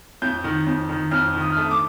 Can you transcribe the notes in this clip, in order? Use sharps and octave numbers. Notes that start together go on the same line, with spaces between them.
F2 G6
D#3
F2
D#3
F2 F6
D#3
D#6
F6
A3 D#6
D6